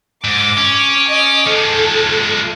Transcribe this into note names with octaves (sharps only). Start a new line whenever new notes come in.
G#2 D6
C#4
D#5 D6
F3 G#3 A4